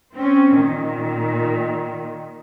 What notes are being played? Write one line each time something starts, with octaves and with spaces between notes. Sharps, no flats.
C4 C#4
A#2 D#3